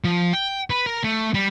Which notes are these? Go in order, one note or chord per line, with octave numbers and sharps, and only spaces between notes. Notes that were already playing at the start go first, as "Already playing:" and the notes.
F3
G5
B4
A#4
A3
G3